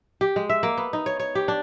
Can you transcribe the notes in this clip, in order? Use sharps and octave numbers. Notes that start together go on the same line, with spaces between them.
G4
G#3
E5
A#3
B3
D#4
C#5
C#5
G4
D4